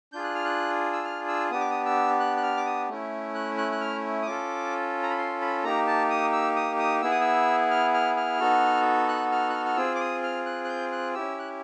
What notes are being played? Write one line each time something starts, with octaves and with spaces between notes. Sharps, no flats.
D4 F4 G#4 G6
F#6
F6
F#6
E6
F6
E6
B3 D4 G4 D#6
D6
D#6
E6
F#6
F#6
F6
D6
D#6
A3 C#4 E4
F#6
F#6
F#6
F6
D#6
C#4 F4 A4 D6
A#5
B5
C6
B5
A#3 D#4 G4 A#5
A5
D#6
E6
D#6
D#6
B3 E4 G#4 E6
D#6
E6
F6
F6
F6
B3 D#4 F#4 A4
F#6
F6
F#6
F6
F6
C4 F4 G#4 E6
D6
D#6
F6
F#6
F#6
G6
F#6
C#4 E4 G4 E6
F#6